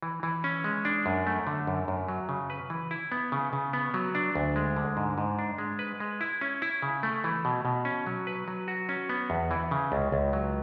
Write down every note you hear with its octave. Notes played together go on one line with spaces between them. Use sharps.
E3
E3
C#4
G#3
D4
F#2
A3
D3
F#2
F#2
F#3
C#3
B4
E3
E4
B3
C#3
C#3
B3
F#3
D4
D2
G#3
D3
G#2
G#2
D4
G#3
B4
G#3
E4
C#4
E4
C#3
A3
E3
B2
B2
C#4
F#3
B4
F#3
F#4
C#4
B3
E2
E3
C#3
C#2
C#2
F#3